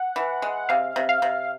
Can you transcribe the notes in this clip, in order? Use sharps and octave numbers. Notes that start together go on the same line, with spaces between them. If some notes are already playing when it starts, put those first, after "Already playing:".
Already playing: F#5
E3
G#3
C3 F5
C3
F5
C3